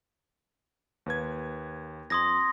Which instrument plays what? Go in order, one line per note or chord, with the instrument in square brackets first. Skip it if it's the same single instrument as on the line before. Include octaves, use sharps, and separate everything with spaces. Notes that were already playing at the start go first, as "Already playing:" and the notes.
[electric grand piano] D#2 B4 G#6
[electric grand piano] F2 G#6 [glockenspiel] C6 D#6 A#6